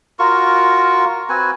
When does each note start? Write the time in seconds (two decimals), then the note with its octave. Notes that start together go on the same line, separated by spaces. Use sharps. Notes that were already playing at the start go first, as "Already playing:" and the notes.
0.19 F4 F#4 A#4 C#6
1.29 C4 F#4 B4 G#5